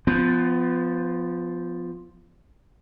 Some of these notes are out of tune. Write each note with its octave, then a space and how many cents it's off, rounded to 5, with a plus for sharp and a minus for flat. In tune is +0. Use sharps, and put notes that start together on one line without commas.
F3 +0 B3 +30